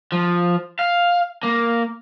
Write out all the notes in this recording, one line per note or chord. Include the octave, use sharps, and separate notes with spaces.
F3
F5
A#3